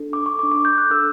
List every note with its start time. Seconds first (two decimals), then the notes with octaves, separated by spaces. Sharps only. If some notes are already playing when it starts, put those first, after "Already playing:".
Already playing: D4 A4
0.13 D6
0.26 C#6
0.39 A4 D6
0.43 D4
0.52 D6
0.65 G6
0.78 F#6
0.90 D4 A4 E6